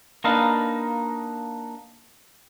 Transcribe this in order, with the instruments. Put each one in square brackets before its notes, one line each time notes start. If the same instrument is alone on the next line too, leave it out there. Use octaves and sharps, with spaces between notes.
[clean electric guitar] A#3 D4 D#4 B4 F5